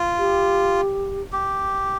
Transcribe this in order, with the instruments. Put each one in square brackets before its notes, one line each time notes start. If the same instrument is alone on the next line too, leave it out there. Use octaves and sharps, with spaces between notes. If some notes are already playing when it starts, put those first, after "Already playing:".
Already playing: [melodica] F4
[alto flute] G4
[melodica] G4